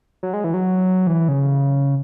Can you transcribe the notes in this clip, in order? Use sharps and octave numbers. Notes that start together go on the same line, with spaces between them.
F#3
G#3
E3
F#3
E3
C#3